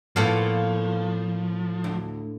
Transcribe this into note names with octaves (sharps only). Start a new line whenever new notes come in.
A2 F3 A#3 B3 F4 A4 F5
D2